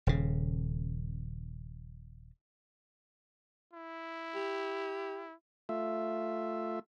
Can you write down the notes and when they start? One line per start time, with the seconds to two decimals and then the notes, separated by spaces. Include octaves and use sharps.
0.07 D#1 C#3
3.73 E4
4.35 G4
5.69 A3 F4 E5